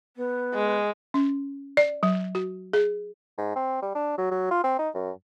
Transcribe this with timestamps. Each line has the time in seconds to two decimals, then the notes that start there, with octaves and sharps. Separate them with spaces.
0.16 B3
0.54 G#3
1.14 C#4
1.77 D5
2.03 F#3
2.35 F#4
2.73 G#4
3.38 G#2
3.56 C4
3.82 G3
3.95 D4
4.18 F#3
4.31 F#3
4.51 F4
4.64 C4
4.79 D#4
4.95 F#2